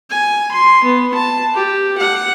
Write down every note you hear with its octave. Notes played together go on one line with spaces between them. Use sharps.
G#5
C6
B3
A5
G4
F#5